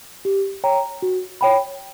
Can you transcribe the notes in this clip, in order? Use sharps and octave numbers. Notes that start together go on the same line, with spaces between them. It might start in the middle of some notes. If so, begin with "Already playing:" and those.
G4
C#5 G5 A#5
F#4
C#5 G5 B5